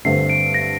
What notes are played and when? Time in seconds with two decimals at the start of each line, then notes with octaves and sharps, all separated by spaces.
0.05 G2 D3 A3 C4 C7
0.30 D7
0.54 A#6